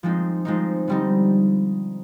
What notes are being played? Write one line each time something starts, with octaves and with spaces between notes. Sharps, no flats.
F3 G#3 C4 D#4
F3 G#3 C4 D#4
D3 G3 C4 D#4